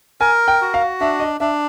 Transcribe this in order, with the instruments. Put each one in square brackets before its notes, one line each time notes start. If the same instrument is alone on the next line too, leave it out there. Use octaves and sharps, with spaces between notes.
[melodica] A#4 [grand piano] G#5
[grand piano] G5
[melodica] F#4
[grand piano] F5
[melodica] D4 [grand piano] E5
[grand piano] D#5
[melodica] D4 [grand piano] E5